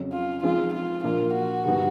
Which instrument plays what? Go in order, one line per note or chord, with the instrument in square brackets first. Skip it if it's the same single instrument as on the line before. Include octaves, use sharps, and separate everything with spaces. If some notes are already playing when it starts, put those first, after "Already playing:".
Already playing: [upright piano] F2 C#3 F#3
[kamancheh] F4
[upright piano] F3 G#3 C4 D#4 G#4 [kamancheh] F4
[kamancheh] F4
[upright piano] A#2 F3 A#3 D4 [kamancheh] F4
[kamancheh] F#4
[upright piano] G2 D3 G3 B3 D#4